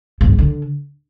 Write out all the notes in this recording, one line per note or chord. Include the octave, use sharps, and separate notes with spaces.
F3
G2
G#2
D3